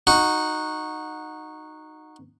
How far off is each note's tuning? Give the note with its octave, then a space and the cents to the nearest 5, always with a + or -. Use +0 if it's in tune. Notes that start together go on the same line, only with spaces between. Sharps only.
D#4 -10 F#4 -10